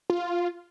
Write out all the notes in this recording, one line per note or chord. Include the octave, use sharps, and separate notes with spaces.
F4